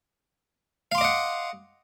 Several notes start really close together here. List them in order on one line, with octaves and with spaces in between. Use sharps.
F5 C6 D6 D#5 F#5